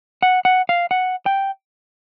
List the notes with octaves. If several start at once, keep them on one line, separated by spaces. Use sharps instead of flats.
F#5
F#5
F5
F#5
G5